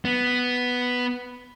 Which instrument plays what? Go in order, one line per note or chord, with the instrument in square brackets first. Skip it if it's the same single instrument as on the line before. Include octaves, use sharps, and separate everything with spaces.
[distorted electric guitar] B3